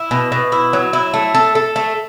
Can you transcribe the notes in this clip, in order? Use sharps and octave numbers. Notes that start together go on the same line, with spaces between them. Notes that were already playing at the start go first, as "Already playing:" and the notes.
Already playing: E4
B2
B2
E4
F#3
E4
A3
A4
A4
A3